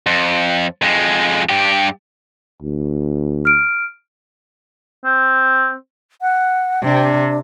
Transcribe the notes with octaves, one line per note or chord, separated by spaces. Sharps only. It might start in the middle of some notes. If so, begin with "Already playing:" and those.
F2
F2 G#3
G2 G4
D2
F6 D7
C4
F#5
C3 D4